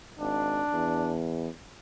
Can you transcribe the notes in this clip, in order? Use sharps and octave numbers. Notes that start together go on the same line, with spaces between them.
G#1 D4
E2